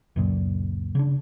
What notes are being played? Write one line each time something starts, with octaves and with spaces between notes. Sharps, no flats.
C#2 F#2 A#2
C#3 D4